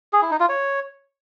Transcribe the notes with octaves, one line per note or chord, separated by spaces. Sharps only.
G#4
E4
D#4
F4
C#5